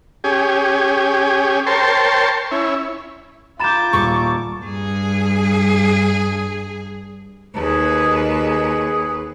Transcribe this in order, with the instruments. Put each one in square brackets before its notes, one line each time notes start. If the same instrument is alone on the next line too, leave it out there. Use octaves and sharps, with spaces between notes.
[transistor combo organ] C#4 G4 G#4
A#4 C5 C#5 G5 A5 C6
C#4 E4
[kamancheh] F4 D6 [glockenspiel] A#5 A6 E7 [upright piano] B5 G6
[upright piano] D#1 [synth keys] C#6
[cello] G2 G#4
[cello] D#2 B4 [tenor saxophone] G#4
[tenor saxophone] G#4